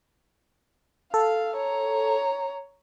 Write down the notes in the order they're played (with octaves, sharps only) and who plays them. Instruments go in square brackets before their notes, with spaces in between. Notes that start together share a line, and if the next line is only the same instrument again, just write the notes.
[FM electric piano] A4 [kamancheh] F5
[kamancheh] C#5 A#5